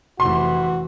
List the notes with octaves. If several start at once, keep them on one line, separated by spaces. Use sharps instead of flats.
F1 E3 F#4 C6